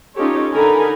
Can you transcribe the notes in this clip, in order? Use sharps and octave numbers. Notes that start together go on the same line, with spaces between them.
C#4 D#4 F4 G4 A4 C#5
D3 D#4 A4 A#4 G#5 B5